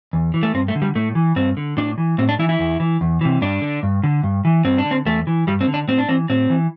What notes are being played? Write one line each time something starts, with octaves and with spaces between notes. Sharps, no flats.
E2
E3
A3
G2 C4
A3
D3
G3
A2 A3
E3
G2 C4
D3
A2 D4
E3
A2 C4
D4
E3 E4
E4
E2
E3
E2
C3 E3
G2 D4
D3
G2
D3
G2
E3
G2 C4
D4
D3
C4
E2 A3
E3
G2 G3
C4
D3
D4
A2 C4
D4
E3 C4
A2 C4
E3